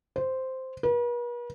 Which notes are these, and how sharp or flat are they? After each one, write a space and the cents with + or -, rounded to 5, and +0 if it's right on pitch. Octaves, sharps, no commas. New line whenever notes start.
C5 -5
B4 -45